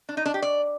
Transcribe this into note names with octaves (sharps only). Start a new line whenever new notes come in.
D4
D#4
D4
G4
D5